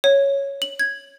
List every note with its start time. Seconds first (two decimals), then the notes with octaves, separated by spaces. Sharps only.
0.04 C#5
0.62 F#7
0.79 G#6